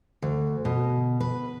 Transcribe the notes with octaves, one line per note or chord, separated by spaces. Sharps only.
D2
B2
B4